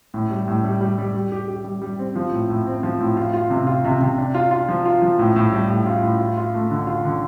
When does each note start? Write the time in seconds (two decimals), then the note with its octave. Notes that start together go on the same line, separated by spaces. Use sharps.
0.14 A2
0.30 G3
0.48 A2
0.64 G3
0.81 G3
0.98 G3
1.14 G3
1.32 G4
1.48 G4
1.65 G3
1.82 G3
1.99 C4
2.16 F3
2.32 A2
2.50 A2
2.67 C4
2.83 F3
3.00 A2
3.17 F4
3.34 F4
3.50 C3
3.67 F4
3.85 C3
4.01 C3
4.18 D4
4.35 F4
4.51 F4
4.69 F3
4.85 F4
5.02 F3
5.19 A2
5.36 A2
5.52 G3
5.70 A2
5.86 F4
6.03 A2
6.20 F4
6.37 F4
6.55 A3
6.71 D3
6.87 F4
7.05 D3